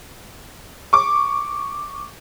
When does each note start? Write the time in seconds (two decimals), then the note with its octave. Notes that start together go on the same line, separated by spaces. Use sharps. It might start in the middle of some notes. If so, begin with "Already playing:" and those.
0.93 C#6 D6